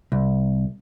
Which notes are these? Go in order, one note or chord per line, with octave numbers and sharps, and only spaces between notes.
C2